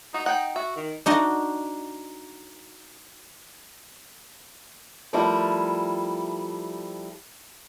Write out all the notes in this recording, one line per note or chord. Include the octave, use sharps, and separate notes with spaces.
D#4 F#4
D#4 F#5 G5
F#4 E5
D#3
D4 D#4 F#4 D#5
F3 G3 A3 E4 A#4